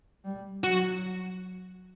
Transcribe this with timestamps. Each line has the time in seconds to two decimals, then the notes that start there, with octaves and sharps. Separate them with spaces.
0.25 G3
0.64 F#3 F#4